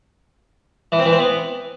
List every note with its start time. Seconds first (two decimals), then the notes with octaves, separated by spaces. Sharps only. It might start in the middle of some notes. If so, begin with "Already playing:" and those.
0.92 E3
0.99 C4
1.06 E3
1.12 C4
1.19 B3